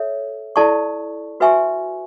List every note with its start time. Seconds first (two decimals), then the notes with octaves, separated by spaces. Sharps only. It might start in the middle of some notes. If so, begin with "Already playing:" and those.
Already playing: A4 C#5 E5
0.56 E4 A4 D5 A5 C#6
1.40 F#4 B4 E5 G#5 C#6